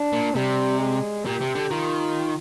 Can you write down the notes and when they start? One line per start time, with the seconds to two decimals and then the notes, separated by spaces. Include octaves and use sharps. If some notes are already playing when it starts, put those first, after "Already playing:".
Already playing: D4
0.13 A#2
0.35 C3 G3
0.80 G#3
1.25 A#2 G4
1.41 C3
1.55 D3
1.70 D#3 F4